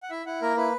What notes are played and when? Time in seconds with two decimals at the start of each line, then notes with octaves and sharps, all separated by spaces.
0.03 F#5
0.10 E4 E5
0.26 E4 F#5
0.42 A#3 A#4
0.57 E4 B4